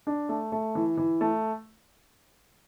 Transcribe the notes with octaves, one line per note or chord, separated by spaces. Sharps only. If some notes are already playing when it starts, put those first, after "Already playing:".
D4
A3
A3
E3
E3
A3